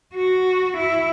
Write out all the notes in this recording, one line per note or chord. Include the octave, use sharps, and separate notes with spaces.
F#4
E4